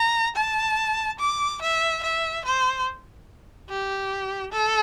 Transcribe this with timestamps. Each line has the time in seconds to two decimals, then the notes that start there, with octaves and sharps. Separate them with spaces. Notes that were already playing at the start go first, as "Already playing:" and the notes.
Already playing: A#5
0.36 A5
1.19 D6
1.62 E5
2.03 E5
2.45 C5
3.70 G4
4.52 A4